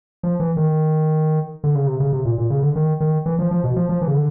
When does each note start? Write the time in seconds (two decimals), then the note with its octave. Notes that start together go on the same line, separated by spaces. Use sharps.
0.23 F3
0.40 E3
0.57 D#3
1.64 D3
1.75 C#3
1.87 C3
2.00 C#3
2.13 C3
2.25 A#2
2.38 A#2
2.50 C#3
2.62 D3
2.76 D#3
3.00 D#3
3.26 E3
3.39 F3
3.51 F3
3.64 B2
3.76 F3
3.89 F3
4.01 E3
4.08 C#3
4.14 D3